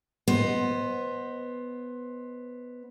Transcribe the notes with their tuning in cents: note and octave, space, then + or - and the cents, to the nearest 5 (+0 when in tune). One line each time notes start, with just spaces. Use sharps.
B3 +0 C5 +15 D#5 +0